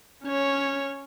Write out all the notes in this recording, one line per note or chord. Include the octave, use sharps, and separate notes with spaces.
C#4 C#5